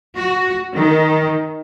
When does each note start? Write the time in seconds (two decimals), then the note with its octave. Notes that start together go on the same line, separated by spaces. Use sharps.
0.17 F#4
0.74 D#3